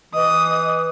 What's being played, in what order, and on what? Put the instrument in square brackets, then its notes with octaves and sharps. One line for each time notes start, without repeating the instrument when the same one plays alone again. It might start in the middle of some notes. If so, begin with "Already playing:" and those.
[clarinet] E3 [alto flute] D#5 [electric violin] D#6